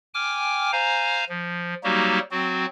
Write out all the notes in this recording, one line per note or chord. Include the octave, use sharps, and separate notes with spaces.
G5 G#5 D6 F6
C5 F5 G#5 A#5
F3
F#3 G3 A#3 D#4 F#4 G4
F#3 C4 F#4